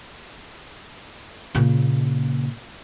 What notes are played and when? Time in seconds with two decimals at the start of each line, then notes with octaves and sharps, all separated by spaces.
1.55 A#2 C#3